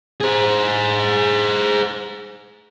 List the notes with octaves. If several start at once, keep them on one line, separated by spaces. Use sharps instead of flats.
G#4 C5